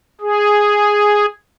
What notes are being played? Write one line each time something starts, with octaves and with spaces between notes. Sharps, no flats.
G#4